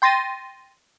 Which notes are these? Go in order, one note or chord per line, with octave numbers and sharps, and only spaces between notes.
G5 C6 A6 A#6 D#7